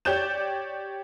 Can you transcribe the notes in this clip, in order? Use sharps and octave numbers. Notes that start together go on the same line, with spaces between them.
G4 C#5 D5 G6 E7